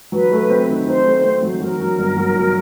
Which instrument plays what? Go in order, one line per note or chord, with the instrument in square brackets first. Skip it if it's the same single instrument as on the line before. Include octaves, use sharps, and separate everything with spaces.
[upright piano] F#3 [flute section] B4
[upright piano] A3
C4
D#3
[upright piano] D#3 [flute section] C5
[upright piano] A3
C4
F#3
[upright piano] F#3 [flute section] A#4
[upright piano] F#3
G1
F#3
F#3